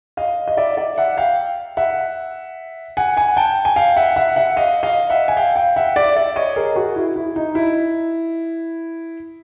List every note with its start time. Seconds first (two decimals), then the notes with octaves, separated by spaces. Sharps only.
0.17 D#5 F5
0.48 D#5
0.57 D5 E5
0.77 D5 E5
0.98 E5 F#5
1.17 F5 G5
1.77 E5 F#5
2.97 F#5 G#5
3.17 F#5 G#5
3.37 G5 A5
3.65 G#5
3.76 F5 G5
3.96 E5 F#5
4.16 E5 F#5
4.36 E5 F#5
4.57 D#5 F5
4.83 D#5 F5
5.10 E5 F#5
5.28 G#5
5.37 F5 G5
5.56 F5 G5
5.76 E5 F#5
5.96 D5 E5
6.16 D5 E5
6.36 C#5 D#5
6.56 G#4 A#4
6.75 F#4 G#4
6.96 E4
7.16 E4
7.36 D#4
7.55 E4